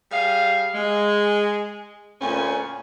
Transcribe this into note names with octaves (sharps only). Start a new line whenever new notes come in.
G3 G#4 F5
G#3
D2 A#2 C#4